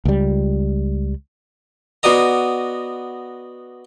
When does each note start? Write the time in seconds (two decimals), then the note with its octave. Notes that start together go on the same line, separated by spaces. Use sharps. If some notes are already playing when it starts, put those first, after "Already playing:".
0.05 C#2 G3
2.03 B3 F#4 D5 D#5 A#5